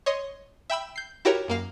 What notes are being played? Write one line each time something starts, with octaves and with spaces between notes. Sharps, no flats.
C#5 D#5 C6
E5 G5 B5 E6
G6 C7
E4 F#4 G4 A#4 C#5 A#5
F#2 A#3 F5